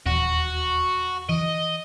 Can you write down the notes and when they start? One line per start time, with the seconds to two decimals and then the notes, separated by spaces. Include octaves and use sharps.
0.06 D#1 E2 F#4
1.29 E3 D#5